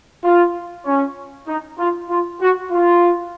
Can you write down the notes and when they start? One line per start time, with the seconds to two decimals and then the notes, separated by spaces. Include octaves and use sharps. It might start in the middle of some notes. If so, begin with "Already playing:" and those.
0.24 F4
0.86 C#4
1.48 D#4
1.79 F4
2.10 F4
2.41 F#4
2.72 F4